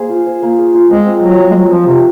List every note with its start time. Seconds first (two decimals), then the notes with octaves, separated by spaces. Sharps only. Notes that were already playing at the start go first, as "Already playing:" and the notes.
Already playing: A#3 G#4 C5
0.09 F4
0.27 C5
0.43 A#3
0.58 G#4
0.75 F4
0.91 G#3 C4
1.07 C4
1.23 F#3 A#4
1.39 F4
1.51 G#3
1.55 F#3 C4
1.71 F3 C4
1.87 C3 A#4